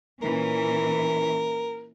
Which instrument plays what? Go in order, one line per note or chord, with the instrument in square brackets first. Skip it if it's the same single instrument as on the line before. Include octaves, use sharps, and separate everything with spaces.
[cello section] A#2 E3 C#4 [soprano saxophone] A#4